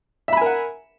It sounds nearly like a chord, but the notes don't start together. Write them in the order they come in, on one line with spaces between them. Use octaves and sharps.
E5 B5 G#5 A#4 F#5